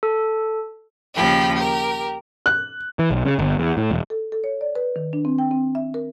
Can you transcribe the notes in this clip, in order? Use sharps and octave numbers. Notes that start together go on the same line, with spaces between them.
A4
D#2 C#3 F3 G4 B5
G4 A#4
F#6
E3
B1
C#3
G1
E2
A2
E1
A4
A4
C#5
D5
B4
D#3
D4
C4
G5
C4
E5
A#4